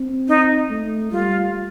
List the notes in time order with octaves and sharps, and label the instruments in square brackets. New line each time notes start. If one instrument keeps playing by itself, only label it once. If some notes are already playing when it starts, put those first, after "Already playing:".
Already playing: [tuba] C4
[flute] D#4
[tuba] A3
[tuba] G3 [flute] F4